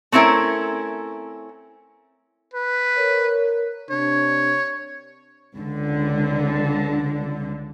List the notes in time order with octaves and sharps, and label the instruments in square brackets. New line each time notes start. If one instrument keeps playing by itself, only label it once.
[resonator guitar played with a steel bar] A3 C4 C#4 E4 A#4
[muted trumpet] B4
[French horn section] A#4 C#5
[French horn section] C3 D4 [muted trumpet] C#5
[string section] C#2 D3